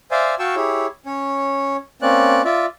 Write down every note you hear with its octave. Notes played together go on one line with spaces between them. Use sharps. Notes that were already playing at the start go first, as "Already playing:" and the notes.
C5 D5 E5 F5 G#5
F#4 F5 G5 A5 C#6 E6
E4 G4 G#4 C#5
C#4 C#5
A#3 C4 C#4 D5 F#6
F4 D5 E5